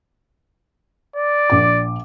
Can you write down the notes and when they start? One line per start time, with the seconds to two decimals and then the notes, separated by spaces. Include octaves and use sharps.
1.16 D5
1.50 A#1 D6